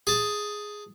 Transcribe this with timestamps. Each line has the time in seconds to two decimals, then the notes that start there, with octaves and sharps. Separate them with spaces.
0.07 G#4 A5